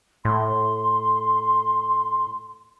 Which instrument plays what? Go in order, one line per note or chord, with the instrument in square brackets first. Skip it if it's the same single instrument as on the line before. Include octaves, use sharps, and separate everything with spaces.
[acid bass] A2 [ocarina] C6